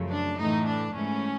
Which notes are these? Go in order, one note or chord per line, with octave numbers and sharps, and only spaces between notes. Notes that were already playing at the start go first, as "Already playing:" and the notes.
Already playing: F#2 C#3 F3 A3
D4
A2 E3 A3 D#4
D4
G#2 E3 A3 C#4